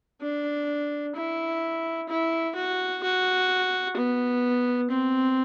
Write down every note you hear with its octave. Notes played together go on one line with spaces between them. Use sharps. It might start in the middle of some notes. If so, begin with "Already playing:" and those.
D4
E4
E4
F#4
F#4
B3
C4